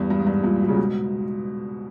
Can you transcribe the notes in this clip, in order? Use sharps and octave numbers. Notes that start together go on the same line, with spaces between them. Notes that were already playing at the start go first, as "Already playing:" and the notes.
Already playing: E2 G2
G2
G#2
G2
G2 A#2
B2
C#3
G#2 B2